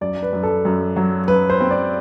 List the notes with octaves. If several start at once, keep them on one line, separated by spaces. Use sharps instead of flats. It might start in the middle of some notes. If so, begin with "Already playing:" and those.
F#2 D5
B4
F#2
A4
F#2
F#3
F#2 B4
C5
C4
D5